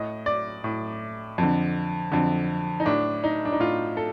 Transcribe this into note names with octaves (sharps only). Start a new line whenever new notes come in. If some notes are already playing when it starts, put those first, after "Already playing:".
Already playing: A2 D#5
D5
A2
F2 D3
F2 D3
D#4
A2 D4
D#4
D4
D#4
A2 F4
A4